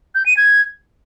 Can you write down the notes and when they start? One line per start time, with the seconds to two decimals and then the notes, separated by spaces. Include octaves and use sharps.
0.15 G6
0.26 D#7
0.37 G#6